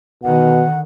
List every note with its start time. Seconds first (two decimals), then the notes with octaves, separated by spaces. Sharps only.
0.24 B2 D3 D#3 F#5